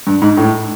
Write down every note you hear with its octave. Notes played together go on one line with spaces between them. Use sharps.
G2
G#2
A2